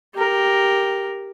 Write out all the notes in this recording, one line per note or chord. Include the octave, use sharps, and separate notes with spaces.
G4 A#4